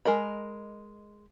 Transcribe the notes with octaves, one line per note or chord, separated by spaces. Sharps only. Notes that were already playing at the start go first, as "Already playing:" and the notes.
G#3 A#4 D#5 B5